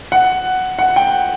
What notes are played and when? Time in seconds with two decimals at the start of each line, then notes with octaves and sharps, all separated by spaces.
0.12 F#5
0.79 F#5
0.96 G5